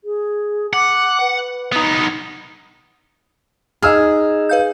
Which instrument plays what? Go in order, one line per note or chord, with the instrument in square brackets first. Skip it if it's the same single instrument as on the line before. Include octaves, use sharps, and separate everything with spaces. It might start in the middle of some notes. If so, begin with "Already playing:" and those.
[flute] G#4
[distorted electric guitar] F#5 [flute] D6
[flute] B4
[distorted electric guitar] B3 D#4
[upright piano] D#4 E6 F6 [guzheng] G#4
[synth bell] B4 F5 G6